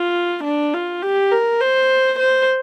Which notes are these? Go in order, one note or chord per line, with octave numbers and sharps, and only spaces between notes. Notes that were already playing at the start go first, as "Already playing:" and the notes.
Already playing: F4
D4
F4
G4
A#4
C5
C5